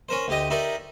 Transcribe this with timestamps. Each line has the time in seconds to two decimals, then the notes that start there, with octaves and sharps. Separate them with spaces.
0.09 C#4 A#4 C5
0.28 D2 G4 D#5
0.50 D#4 E4 G4 A#4 D5